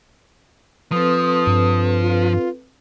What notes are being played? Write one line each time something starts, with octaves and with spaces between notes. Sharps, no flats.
F3 C4 A4 B4 D#6
G2
F4